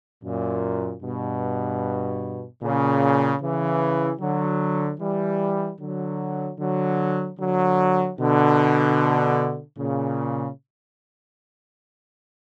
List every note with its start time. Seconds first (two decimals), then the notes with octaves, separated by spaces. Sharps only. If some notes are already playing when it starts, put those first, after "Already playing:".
0.23 F#2 A#2
1.02 G2 B2
2.62 A#2 C#3
3.41 C#3 E3
4.20 D3 F#3
5.00 E3 G3
5.79 D3 F#3
6.59 D3 F#3
7.39 D3 F#3
8.18 B2 D3
9.76 A#2 C#3